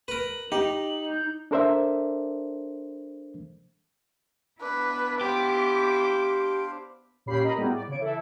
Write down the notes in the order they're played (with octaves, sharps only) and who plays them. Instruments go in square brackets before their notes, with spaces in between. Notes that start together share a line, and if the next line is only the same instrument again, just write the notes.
[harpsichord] A#4 B4 [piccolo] F#7
[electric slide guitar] D#4 [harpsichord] G4
[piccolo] G6
[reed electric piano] D4 A4 A#4 C5 D5 E5
[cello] B3 E4 [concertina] D4 [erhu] B4
[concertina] D4 C5 F5 [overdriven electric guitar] G4 [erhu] D6
[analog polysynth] A#2 C#4 G4 B5 C7
A#4 D#5 A#5 B5
A2 G3 B3 C4 F#4 G#4
D5
C#3 C#5 D7
E3 E4 A4